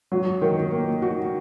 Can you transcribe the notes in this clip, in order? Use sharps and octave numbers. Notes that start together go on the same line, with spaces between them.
F#3
D#3
A#3
F#4